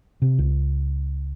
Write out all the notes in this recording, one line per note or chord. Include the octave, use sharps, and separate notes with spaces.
C3
C#2